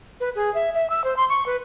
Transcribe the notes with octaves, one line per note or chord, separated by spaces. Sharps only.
B4
G#4
E5
E5
E6
C5
C6
C#6
B4